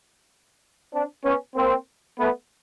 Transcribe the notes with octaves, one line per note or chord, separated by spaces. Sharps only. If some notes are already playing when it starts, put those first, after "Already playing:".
C4 D4
B3 C#4
A#3 C4
A3 B3